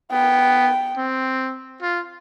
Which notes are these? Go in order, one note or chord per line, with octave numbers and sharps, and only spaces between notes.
B3 G5
C4
F4